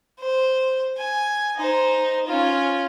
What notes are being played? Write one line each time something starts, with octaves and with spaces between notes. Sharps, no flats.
C5
G#5
D#4 C5
C#4 F4